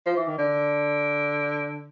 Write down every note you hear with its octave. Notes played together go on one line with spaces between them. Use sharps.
F3
E3
D#3
D3